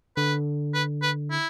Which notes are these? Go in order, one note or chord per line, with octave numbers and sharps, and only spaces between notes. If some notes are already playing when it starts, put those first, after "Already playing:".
D3 B4
B4
B4
E4